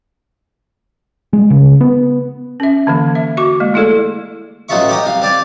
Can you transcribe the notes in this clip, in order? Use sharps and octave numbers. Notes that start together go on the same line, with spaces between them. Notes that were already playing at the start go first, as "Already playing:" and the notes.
G#3
C#3
B3
C#4 E5
D3 E3 A#3
E5
F#4 C#6 D6
G#3 A#3
A3 E4 G#4 A4 D5
A1 F#3 D#4 F4 E5 C#6
D#4 G4 D#5
C2 F5
C4 D5 F5 G#5